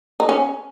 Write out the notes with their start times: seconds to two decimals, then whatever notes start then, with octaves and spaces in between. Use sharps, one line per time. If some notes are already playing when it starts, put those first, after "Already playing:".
0.20 D#4
0.29 C#4